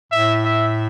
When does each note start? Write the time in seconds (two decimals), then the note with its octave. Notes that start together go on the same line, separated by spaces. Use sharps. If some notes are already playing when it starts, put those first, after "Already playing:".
0.12 A2 E5
0.44 E5